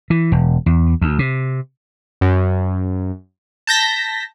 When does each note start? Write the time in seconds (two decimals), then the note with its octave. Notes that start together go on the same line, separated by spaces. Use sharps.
0.10 E3
0.32 E1
0.66 E2
1.02 D2
1.19 C3
2.21 F#2
3.67 A5 G6 A#6 B6